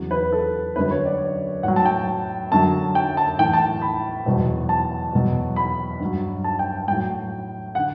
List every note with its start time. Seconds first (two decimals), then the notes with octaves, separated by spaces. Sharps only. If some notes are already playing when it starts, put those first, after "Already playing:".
Already playing: E2 C#3 F#3
0.11 B4
0.32 A4
0.76 F#2 D3 F#3 B4
0.91 C#5
1.05 D5
1.63 A2 F#3 F#5
1.76 A5
1.86 G5
2.51 F#2 D3 F#3 A5
2.95 G5
3.17 A5
3.38 A2 E3 G5
3.54 A5
3.82 B5
4.26 E2 B2 F#3
4.69 A5
5.13 E2 B2 F#3
5.56 B5
6.00 G2 F#3
6.44 A5
6.59 G5
6.88 A2 F#3 G5
7.75 D3 F#5